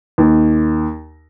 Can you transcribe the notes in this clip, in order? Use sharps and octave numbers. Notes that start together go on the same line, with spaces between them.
D#2